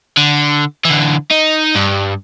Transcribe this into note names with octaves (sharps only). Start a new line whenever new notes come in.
D3
D3 E3
D#4
G2